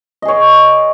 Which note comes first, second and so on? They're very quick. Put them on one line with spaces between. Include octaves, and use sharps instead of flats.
D#5 G#4 C#5